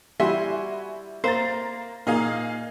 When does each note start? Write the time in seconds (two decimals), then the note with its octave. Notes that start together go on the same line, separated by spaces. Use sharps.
0.20 G3 E4 F#4 E5 G#5 C6
1.24 A#3 C5 A#5 A6
2.07 A#2 A#3 D#4 G#4 F5